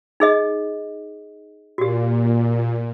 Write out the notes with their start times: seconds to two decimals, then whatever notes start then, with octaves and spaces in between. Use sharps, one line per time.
0.20 D#4 G#4 D#5
1.78 A#2 F#4 G4